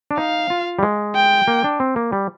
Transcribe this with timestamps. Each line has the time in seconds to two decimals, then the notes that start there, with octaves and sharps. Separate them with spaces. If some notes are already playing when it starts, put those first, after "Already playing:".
0.11 D4
0.18 D#4 F5
0.50 F4
0.79 G3
0.83 G#3
1.15 G5
1.48 A#3
1.64 D4
1.80 C4
1.96 A#3
2.12 G3